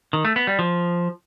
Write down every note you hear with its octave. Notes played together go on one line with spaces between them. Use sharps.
D#3
A3
B3
G3
F3